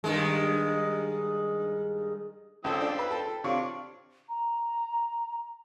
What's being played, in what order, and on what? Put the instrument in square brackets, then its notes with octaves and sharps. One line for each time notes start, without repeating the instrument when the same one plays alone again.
[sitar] G2 D#3 G#3
[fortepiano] C#2 A4 [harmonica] F3 G5 E6
[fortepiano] D4
B4
A4
[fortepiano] C3 F4 C#5 [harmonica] D4
[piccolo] A#5